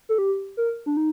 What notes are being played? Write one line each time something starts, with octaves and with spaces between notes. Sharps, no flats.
A4
G4
A#4
D4
D#4